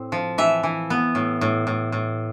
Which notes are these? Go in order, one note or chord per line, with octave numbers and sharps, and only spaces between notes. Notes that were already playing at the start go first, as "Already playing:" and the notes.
Already playing: A2 C4
F3
E3 E5
E3
B3
A2
A2
A2
A2